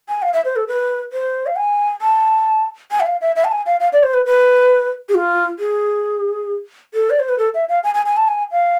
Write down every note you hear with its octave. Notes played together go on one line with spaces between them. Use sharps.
G#5
F5
E5
C5
A4
B4
C5
F5
G#5
A5
G#5
E5
F5
E5
E5
A5
G#5
F5
F5
D5
C5
B4
B4
G#4
F4
G#4
A4
D5
C5
B4
A4
E5
F5
G#5
G#5
G#5
A5
G#5
F5